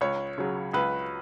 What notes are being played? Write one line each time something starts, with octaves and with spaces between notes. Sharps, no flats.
C#2 C#5
C#3 F#3
C#2 B4